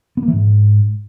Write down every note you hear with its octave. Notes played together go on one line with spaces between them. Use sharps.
B3
A#3
E3
G#2